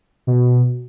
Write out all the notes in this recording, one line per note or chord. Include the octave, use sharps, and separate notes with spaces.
B2